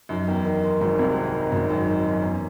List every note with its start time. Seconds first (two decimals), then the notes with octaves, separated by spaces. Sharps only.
0.09 F#2 D#4
0.27 E2 D#3
0.45 D#3
0.63 G#3
0.81 G#1 G#2 D#4
0.98 C2 C3 D#3
1.16 D#3
1.34 G#3
1.51 G#1 G#2 C#4
1.69 F#2 D#3
1.87 D#3
2.05 G#3
2.12 F#2
2.22 E2 C#4